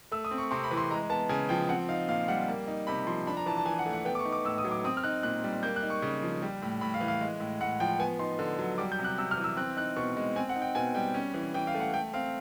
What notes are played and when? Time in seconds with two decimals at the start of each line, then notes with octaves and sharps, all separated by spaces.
0.12 A3 E6
0.25 D#6
0.31 C4
0.38 C#6
0.51 C3 C6
0.64 B5
0.71 E3
0.77 C6
0.90 G#3 A#5
1.10 B3 A5
1.29 C#3 G#5
1.49 F3 G5
1.69 C4 F#5
1.89 D#4 F5
2.08 A#2 F5
2.28 G3 F#5
2.48 A#3
2.68 D#4
2.87 C3 B5
3.07 F3 C6
3.27 D4 B5
3.37 A#5
3.46 E3 A5
3.57 A5
3.66 E3 G#5
3.79 F#5
3.86 A3
3.93 F#5
4.05 B3 G5
4.15 D6
4.19 C#6
4.25 D#4
4.32 D6
4.44 A2 E6
4.58 D#6
4.64 F#3
4.71 D6
4.84 C4 D#6
4.97 F6
5.04 D#4 F#6
5.23 A#2 F#6
5.44 G3
5.63 A#3 G6
5.76 F#6
5.83 D#4
5.90 C#6
6.02 C#3
6.23 F3
6.42 G3
6.62 A2
6.81 A2 B5
6.94 F5
7.01 E3
7.08 F5
7.21 G#3
7.40 A2
7.61 A2 F#5
7.80 F3 G5
7.99 B3 G#5
8.19 D#4 C6
8.39 D3
8.59 F#3
8.78 G3 D6
8.92 G6
8.99 C3
9.04 F#6
9.18 C3 E6
9.31 F6
9.37 E3
9.44 E6
9.57 C4 F#6
9.77 D#4 F#6
9.96 B2 C#6
10.17 G#3
10.36 C4 G#5
10.49 F#5
10.56 D#4
10.62 G5
10.75 B2 G#5
10.95 G3 G5
11.14 C#4
11.34 E3
11.54 E3 G5
11.67 F5
11.75 A3
11.80 F#5
11.94 A3 G5
12.14 C4 F5